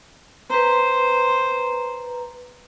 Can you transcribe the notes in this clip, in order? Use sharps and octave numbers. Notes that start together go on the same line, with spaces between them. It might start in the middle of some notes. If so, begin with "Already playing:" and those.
B4 C5 A#5